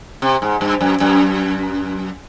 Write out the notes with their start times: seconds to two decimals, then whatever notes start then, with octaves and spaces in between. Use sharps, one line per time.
0.22 C3
0.42 G#2
0.61 G2
0.81 F#2
1.00 F#2